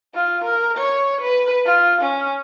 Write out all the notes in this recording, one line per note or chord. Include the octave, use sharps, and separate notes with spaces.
F4
A#4
C#5
B4
F4
C#4